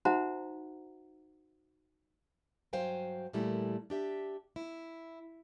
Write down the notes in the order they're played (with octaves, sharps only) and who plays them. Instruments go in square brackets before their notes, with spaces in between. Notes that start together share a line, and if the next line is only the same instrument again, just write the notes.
[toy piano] D#4 F#4 C5 E5 F#5 A#5
[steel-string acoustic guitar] G2 F#3 C5 F5 G5 G#5
A#2 E3 G3 A3 E4 A#4
D4 G4 E5
E4